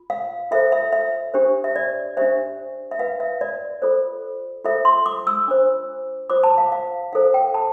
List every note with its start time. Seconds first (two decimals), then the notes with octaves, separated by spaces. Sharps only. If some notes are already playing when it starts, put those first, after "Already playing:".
Already playing: F4
0.10 F5
0.51 F4 A4 C5 E5
0.72 E5
0.93 E5
1.34 D4 G4 C5
1.64 E5
1.76 D5
2.17 D4 G4 C5 E5
2.91 E5
2.99 F4 B4 F5
3.20 E5
3.41 D5
3.82 F4 A4 C5
4.64 F4 A4 C5 E5
4.85 C6
5.06 D6
5.27 E6
5.48 D4 F4 C5
6.30 F4 C5 D6
6.44 A5
6.58 F5
6.72 F5
7.13 E4 A4 C5 F5
7.34 G5
7.54 A5